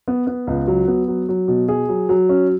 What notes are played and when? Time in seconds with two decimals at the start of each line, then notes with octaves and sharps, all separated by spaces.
0.08 B3
0.27 B3
0.47 C#2
0.67 F#3
0.88 B3
1.08 F#3
1.29 F#3
1.48 B2
1.68 G#4
1.89 F#3
2.09 F#3
2.29 C#4